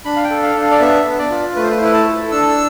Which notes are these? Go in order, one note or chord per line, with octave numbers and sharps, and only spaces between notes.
D4 B5
F5
G5
A4
F5
D4
F5
D5
B3 E5
D4
D5
F4
A3 B4
C5
B4
C5
E4 B4
A5
A4
D4 E6